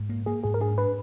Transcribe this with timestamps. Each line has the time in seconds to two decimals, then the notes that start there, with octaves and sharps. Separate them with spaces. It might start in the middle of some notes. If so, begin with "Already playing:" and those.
Already playing: G#2
0.09 A#3
0.26 A#3 G#4
0.44 G#2 G#4
0.54 A#4
0.60 D4 G#4
0.78 D4 B4